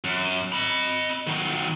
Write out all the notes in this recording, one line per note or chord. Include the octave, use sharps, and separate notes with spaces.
F#2
D#5 B5
D#3 F#3